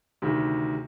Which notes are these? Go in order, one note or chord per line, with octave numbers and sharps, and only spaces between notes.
D2 C3 D#3